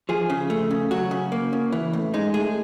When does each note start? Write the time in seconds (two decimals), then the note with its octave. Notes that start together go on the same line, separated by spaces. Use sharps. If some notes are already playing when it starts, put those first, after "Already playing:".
0.09 F3 G#4
0.30 C#3
0.50 A3
0.71 C#3
0.91 F#3 F#4
1.11 C#3
1.32 A#3
1.53 C#3
1.72 E3
1.93 A2
2.14 G#3 D#4
2.34 A2 G#4